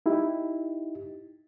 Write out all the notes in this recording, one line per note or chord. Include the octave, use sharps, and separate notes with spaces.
D#4 E4 G4